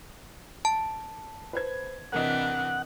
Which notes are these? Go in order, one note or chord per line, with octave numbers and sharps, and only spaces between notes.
A5
B4 C5 G#6
C3 E3 D4 A#4 D#5 F#5